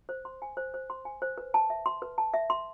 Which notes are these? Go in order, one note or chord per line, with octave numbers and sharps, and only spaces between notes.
C5
C6
G#5
C5
C5
C6
G#5
C5
B4
A5
E5
C6
B4
A5
E5
C6